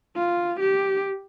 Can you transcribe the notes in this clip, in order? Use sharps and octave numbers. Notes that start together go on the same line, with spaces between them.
F4
G4